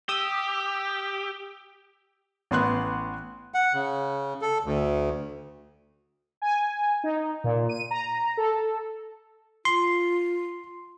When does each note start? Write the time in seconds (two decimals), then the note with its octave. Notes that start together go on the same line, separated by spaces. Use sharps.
0.09 G4 D#6 E6
2.51 A1 B3 C6 F#6
3.54 F#5
3.74 C#3
4.42 A4
4.65 D2
6.42 G#5
7.04 D#4
7.44 A#2
7.69 D#7
7.91 A#5
8.37 A4
9.65 F4 C6